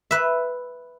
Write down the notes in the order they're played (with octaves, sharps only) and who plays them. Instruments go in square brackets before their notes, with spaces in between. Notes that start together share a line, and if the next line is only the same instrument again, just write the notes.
[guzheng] B4 E5